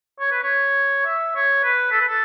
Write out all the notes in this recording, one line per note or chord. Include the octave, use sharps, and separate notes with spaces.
C#5
B4
C#5
E5
C#5
B4
A4
B4
A4